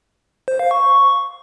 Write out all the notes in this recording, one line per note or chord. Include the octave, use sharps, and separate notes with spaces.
C5
F5
C#6